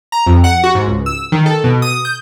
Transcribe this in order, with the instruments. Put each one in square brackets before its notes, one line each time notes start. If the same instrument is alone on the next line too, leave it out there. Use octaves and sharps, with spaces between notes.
[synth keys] A#5
F2
F#5
F#4
G#2
C#2
E6
D#3
A4
B2
D#6
G6